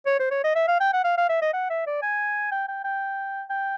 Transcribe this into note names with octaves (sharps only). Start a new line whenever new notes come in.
C#5
C5
C#5
D#5
E5
F5
G5
F#5
F5
F5
E5
D#5
F#5
E5
D5
G#5
G5
G5
G5
G5